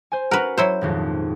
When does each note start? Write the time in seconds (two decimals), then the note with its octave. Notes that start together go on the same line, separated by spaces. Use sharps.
0.12 C5 G#5
0.31 C#4 F#4 A#4 B4 F#5
0.58 F#3 E4 C5 G6
0.81 D#1 G#1 F2